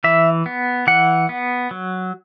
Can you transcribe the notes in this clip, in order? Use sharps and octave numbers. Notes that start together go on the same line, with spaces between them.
E3 E5
B3
E3 F#5
B3
F#3